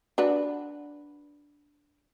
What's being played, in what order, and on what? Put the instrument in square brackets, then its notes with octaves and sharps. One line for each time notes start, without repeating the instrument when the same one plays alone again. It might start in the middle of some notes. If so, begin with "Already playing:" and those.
[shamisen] D4 F#4 B4